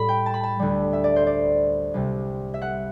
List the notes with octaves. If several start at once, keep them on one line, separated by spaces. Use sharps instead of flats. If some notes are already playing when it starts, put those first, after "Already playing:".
Already playing: A2 G3 B5
G5
A5
B5
A5
D2 D3 G3
E5
D5
C5
D5
C2 C3 G3
E5
F#5